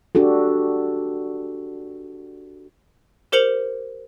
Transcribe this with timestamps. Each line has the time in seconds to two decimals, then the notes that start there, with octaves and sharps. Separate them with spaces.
0.15 D4 F#4 G4 A4
3.32 G4 A#4 C5 C#7 F7 F#7